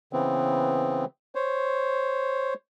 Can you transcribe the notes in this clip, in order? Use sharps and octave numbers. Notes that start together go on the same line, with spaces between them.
C#3 E3 B3 C4
C5 C#5